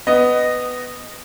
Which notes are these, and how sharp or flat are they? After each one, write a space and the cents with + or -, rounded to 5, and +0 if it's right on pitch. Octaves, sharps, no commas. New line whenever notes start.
B3 +10 D#5 -10